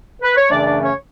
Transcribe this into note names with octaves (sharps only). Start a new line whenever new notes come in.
B4
C#5
F#2 C#3 E3 A3 D4 D5
D4 D5
C#4 C#5